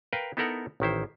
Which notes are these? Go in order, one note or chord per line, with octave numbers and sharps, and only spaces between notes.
A#4 B4 F5 G5
B3 D#4 E4 A4 A#4 F#5
A1 D#3 E4 C5